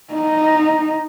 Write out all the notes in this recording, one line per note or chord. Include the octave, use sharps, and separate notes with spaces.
D#4